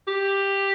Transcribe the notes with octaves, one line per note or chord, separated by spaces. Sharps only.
G4